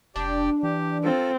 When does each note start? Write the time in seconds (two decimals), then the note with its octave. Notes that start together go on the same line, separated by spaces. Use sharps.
0.16 F1 D4 G4 D5 G5
0.63 E3 G4
1.04 C4 F4 A4